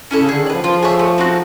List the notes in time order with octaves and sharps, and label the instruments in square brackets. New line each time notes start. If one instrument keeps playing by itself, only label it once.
[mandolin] C#4 E4 A4
[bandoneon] C#3
[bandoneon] D3 [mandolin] G#4
[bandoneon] D#3
[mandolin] D5
[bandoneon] F3 [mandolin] B4
[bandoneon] F3 [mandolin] F4
[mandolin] G#4 C#5 E5
A3
C4 D#4 F#4